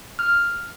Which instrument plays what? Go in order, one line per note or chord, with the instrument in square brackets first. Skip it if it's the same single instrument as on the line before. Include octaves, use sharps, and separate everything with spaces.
[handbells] F6